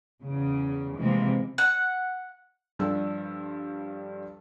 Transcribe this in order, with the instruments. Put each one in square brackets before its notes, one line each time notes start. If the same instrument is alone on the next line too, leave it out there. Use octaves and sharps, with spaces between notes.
[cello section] E2 C#3
C3 E3 F3 G#3 A#3 C4
[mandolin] F#5
[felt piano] G2 F3 G3 D4 A4 E6